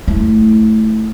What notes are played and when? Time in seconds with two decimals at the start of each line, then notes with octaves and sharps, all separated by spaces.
0.08 A3 E4